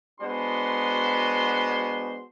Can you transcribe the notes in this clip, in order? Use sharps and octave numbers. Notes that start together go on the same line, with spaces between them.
G#3 B3 D4 F#4 C5 C6